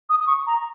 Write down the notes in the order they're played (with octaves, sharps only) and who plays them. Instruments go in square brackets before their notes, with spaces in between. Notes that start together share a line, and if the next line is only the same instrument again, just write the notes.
[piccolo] D#6
D#6
C#6
A#5